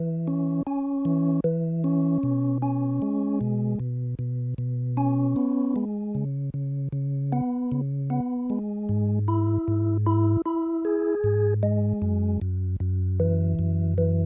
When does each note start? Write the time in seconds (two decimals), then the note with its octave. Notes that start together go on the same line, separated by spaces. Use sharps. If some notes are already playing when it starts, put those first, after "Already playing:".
Already playing: E3
0.27 C#4
0.67 C#4
1.05 E3
1.44 E3
1.84 C#4
2.23 B2
2.62 C#4
3.02 G#3
3.41 B2
3.80 B2
4.19 B2
4.58 B2
4.97 C#4
5.36 B3
5.76 G#3
6.15 C#3
6.54 C#3
6.92 C#3
7.32 B3
7.72 C#3
8.10 B3
8.50 G#3
8.89 G#2
9.28 E4
9.68 G#2
10.06 E4
10.46 E4
10.85 G#4
11.24 G#2
11.63 G#3
12.02 F#2
12.42 F#2
12.80 F#2
13.20 E3
13.59 F#2
13.98 E3